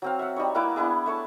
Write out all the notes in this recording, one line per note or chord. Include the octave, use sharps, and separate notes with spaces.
F#3 C4 F5
E5 F#5
G3 D#4 C#5
A#3 E4 B4 D6
B3 D4 E4 G#4
A3 C#5 A5